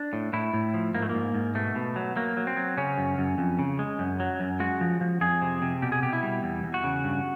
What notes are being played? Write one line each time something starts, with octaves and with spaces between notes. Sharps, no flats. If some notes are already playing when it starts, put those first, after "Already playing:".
Already playing: D4
A2
A2 E4
A2
F3
G#2 A#3
A3
G#2 A#3
G#2
B2 A3
B2
F#3
F#3 A#3
F#3
C4
F#3
C#3 C#4
F#2
F#2
F2
C#3
G#3
F#2
F#3
F#2
G#3 F#4
F3
F3
F2 G#4
C3
C3
B2 G4
G#4
B2 G4
E4
G3
E2
E2
F#4
C#3
G2